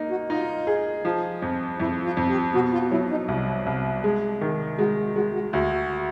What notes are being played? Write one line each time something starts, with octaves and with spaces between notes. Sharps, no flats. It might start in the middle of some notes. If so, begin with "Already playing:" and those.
Already playing: A#3 D#4
F#4
D#4 F4
G#4
F3
F2
F2 E4
F4
F2
G4
B2 F#4
F4
F#3 E4
D#4
C2
C2
G#3
D#3
G#3 F#4
G#3 F#4
F#4
D2 F#4